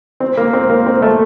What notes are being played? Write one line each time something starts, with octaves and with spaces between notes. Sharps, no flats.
C4
A#3
C4
A#3
C4
A3